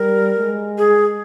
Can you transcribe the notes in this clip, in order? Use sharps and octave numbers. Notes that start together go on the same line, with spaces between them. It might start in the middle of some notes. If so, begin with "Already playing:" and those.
Already playing: G3 A#4
G#3
G#4